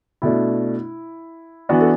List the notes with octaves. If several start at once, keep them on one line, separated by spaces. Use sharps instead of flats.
B2 A3 D4 E4
E3 B3 D4 F#4
A4